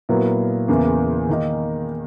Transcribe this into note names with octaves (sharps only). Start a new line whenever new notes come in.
A#2 F#3 B3 E4 A#4
E2 C#3 E3 A#3
D#3 A#3 D#4